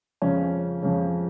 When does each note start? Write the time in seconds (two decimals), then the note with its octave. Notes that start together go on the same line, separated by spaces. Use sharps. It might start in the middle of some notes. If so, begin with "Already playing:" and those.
0.22 F2 C#3 C#4
0.82 F2 C#3